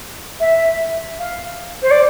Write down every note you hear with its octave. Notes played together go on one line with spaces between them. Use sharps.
E5
F5
C5
D5